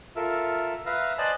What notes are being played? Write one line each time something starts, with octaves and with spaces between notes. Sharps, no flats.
F4 A4 A#4 E5
B4 E5 F5 A#5
C5 D5 D#5 G#5 A5 F#6